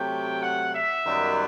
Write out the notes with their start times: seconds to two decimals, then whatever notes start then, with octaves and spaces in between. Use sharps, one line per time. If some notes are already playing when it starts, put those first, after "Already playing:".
Already playing: C3 F#3 A3 G5
0.43 F#5
0.74 E5
1.06 F#2 D#3 G3 B3